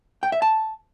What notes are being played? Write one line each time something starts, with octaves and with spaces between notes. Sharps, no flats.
G5
E5
A5